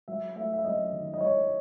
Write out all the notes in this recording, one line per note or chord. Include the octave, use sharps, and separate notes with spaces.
F#3 E5
A3 E5
E5
F#2 D#5
D#3
D#5
F#3 C#5